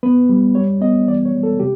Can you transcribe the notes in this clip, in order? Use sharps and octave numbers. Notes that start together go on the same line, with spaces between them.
B3 B4
G3
G3 C#5
B3 D#5
E3 D5
C#5
G#3
A4
C3 G4